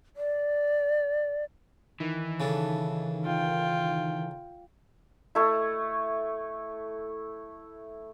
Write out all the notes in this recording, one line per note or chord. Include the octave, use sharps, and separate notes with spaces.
D5
D#3 E3
C#3 D4 A4
F4 G5
A3 E4